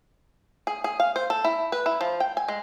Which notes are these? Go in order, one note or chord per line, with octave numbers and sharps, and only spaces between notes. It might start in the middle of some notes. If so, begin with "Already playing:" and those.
G#4
G#4
F5
C5
A4
E4
B4
E4
F3
G5
G#5
G#3